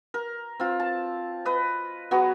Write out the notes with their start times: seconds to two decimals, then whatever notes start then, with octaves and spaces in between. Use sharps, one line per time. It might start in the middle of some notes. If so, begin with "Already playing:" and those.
0.14 A#4
0.60 C4 F4
0.80 A5
1.45 B4 D#5
2.11 F#3 B3 F#4 G#4